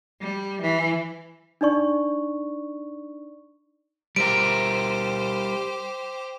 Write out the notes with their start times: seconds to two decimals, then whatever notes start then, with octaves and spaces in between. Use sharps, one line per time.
0.21 G3
0.62 E3
1.61 D4 D#4 D5 C#6
4.16 G3 G4 A#4 C5 D7